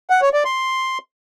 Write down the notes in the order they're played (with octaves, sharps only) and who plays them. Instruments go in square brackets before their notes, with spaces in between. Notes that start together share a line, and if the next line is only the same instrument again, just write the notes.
[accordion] F#5
C#5
D5
C6